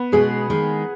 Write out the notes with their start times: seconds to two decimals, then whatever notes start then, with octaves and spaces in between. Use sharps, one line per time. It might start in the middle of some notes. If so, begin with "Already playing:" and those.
Already playing: B3
0.12 B2 G#3 C#4 G#4
0.50 D#3 G#3 D#4